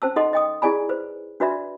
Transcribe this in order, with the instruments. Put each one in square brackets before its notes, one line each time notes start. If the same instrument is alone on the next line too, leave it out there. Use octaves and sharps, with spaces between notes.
[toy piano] C#4 C5 A5 E6
D#4 A4 D#5 F#5 C6
D#5 G5 D#6
E4 G#4 D5 G#5 B5
B4 C5
D4 F#4 B4 D5 E5 B5